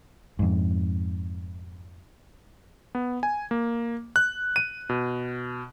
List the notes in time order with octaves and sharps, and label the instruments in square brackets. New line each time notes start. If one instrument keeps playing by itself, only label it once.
[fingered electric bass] F2 G#2
[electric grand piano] B3
G#5
A#3
F#6
D#7
B2